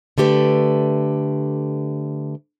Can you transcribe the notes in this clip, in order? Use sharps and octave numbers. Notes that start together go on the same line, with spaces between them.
D3 A3 G4 B4